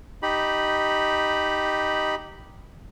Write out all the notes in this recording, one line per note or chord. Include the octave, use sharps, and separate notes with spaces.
D#4 G4 B5